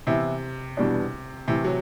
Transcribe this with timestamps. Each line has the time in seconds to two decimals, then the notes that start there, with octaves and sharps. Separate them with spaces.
0.07 C3 E3 B3 E4
0.77 E2 B2 G3 D4
1.47 A2 C3 E3 A3
1.64 F#3